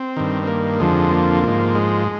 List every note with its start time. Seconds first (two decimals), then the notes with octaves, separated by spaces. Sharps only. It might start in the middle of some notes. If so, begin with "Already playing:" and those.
Already playing: C4
0.17 G2 D#3
0.43 C4
0.47 A#3
0.79 F2 D3 F3 G#3
1.11 A#3
1.43 G#2 F3
1.75 G#3